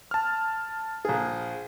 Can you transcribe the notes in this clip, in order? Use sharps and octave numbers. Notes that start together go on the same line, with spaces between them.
A5 F6
A#1 G#4